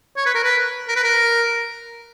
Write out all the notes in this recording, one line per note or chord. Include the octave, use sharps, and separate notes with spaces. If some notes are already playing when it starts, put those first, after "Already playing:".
C#5
B4
A#4
B4
A#4
B4
A#4